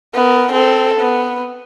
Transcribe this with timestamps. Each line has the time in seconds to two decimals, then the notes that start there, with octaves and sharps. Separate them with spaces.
0.14 B3 A#4
0.52 C4 A4
1.01 B3